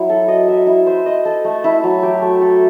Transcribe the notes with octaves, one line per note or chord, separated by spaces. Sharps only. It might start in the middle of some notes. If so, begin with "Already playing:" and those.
Already playing: F#3 E4
A4
D#5
E5
E4
C5
D#5
A4
A3
E4
F#3
G4
A3
A4